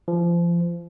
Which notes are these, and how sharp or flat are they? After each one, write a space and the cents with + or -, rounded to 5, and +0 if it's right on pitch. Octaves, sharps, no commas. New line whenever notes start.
F3 -30